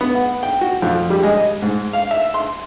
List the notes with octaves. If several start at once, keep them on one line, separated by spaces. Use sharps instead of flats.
B3
F#5
G5
F#4
F2
G3
G#3
D#5
G#2
F5
E5
C6